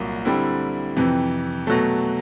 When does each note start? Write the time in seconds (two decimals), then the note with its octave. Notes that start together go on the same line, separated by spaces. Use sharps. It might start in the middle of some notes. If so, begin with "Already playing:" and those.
Already playing: C2 A#2 F#3 A#3
0.25 D3 G3 C4 E4
0.97 F2 C3 E3
1.67 B2 F#3 A3